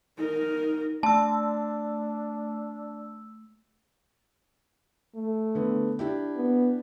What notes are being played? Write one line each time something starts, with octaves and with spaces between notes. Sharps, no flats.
D#4 A#4
A3 D4 A5 E6
A3
D3 B3
D4 E4 G4
B3